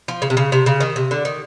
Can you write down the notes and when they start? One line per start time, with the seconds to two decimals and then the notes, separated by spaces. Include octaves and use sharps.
0.08 F3
0.22 C#3
0.30 C3
0.37 C#3
0.52 C3
0.66 C#3
0.80 D#3
0.96 C3
1.11 D3
1.25 D#3